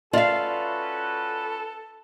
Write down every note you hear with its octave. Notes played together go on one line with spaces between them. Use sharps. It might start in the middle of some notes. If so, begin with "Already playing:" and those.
C#4 F4 F#4 A4 B4 D5 E5 F5